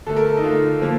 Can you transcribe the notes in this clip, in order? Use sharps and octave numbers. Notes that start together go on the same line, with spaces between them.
D3 A3 A4
A#4
A4
D#4
D3 A3 F4
D3 F3 A#3